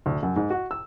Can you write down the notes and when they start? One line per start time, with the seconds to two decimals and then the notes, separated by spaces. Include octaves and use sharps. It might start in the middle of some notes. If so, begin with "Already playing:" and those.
0.06 D2
0.23 F#2
0.36 G#2
0.50 F#4
0.71 E6